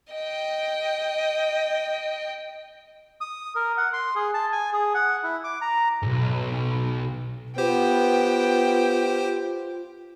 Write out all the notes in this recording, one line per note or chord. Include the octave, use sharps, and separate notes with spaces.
D#5 G5
D#6
A#4
F#5
C6
G#4
A5
G#5
G#4
F#5
E4
D6
A#5
B1 G#2
B3 F4 G4 C5 G5